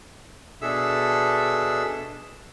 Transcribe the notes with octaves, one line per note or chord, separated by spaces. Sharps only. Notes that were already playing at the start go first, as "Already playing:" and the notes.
B2 D4 G#4 A4 E5 E6